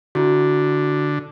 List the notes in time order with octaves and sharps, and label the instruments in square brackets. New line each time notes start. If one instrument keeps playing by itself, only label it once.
[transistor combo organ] D3 [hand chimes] E4 F#4